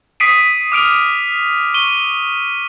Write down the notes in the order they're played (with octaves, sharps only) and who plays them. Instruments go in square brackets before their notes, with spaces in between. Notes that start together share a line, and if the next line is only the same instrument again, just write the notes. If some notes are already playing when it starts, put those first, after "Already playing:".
[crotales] D#6 B6 C7 D7 D#7
D6 F6 D7 F7
C#6 D#7 G7